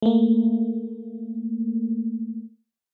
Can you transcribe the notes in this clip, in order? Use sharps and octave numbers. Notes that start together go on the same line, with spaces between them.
A3 A#3